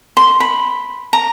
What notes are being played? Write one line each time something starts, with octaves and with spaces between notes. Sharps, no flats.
C6
B5
A#5